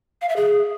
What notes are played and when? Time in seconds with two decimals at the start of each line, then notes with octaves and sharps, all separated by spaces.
0.22 F5
0.29 E5
0.36 G#4